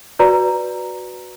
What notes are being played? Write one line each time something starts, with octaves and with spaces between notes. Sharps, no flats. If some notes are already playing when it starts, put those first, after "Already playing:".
F#4 B4 D5 A#5